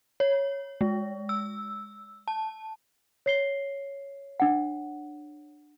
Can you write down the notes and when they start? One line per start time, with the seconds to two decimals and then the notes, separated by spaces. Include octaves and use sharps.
0.20 C#5
0.81 G#3
1.29 E6
2.28 A5
3.26 C#5 C7 G7
4.40 D4 F#5